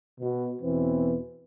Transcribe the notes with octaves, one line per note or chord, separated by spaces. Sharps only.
B2
E2 B2 E3 C4 B4